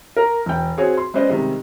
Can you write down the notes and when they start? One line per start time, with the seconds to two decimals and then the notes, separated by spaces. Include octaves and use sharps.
0.17 A#4
0.46 E1 G5
0.78 C4 F#4 G#4 C#5
0.97 C6
1.14 G#3 B3 C#4 C5 D5 D#5
1.29 C3 D#3 G3 G#3